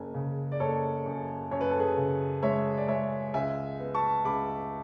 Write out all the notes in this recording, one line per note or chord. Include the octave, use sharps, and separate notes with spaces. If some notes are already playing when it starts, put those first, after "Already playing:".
Already playing: F#1 G#5
C#3
D5
F#1 A4 C#5
F#2
F#2 C#5
B4
A4
G#4 B4
C#3
G#3 C#5 E5
D5
G#3 C#5 E5
C#2 E5 G#5
B3
A5 C#6
C#2 B5 D6